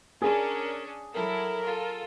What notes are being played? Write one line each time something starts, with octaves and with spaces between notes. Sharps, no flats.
C#4 D4 G#4 A#4
F#3 E4 A4 A#4
F4 A4